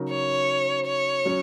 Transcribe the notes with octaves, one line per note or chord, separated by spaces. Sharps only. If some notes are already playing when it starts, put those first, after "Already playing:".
Already playing: C#3 F#3 D#4 A#4
C#5
C#5
F#3 C#4